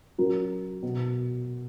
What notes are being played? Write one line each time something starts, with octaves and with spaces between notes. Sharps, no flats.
F#3 C#4 F#4 A#4
B2